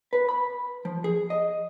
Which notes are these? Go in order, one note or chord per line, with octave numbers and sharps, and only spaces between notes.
B4
B5
F3
G#4
D#5